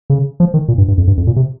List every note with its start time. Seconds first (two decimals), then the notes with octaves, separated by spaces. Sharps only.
0.10 C#3
0.40 F3
0.54 D#3
0.68 A#2
0.78 G2
0.88 G2
0.98 F2
1.07 G2
1.17 F2
1.27 A#2
1.36 C3